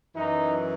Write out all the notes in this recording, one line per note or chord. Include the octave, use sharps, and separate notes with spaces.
F#2 E3 D#4